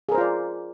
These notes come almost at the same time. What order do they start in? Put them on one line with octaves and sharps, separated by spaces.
G#4 A#4 C5 F4 D5